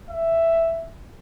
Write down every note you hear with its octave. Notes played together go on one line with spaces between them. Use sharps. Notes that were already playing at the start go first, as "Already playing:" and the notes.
E5